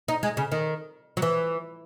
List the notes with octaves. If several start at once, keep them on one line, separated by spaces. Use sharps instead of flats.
D#4
G#3
C#3
D#3
F#3
E3